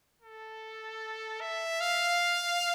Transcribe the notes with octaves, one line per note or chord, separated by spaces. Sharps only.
A4
E5
F5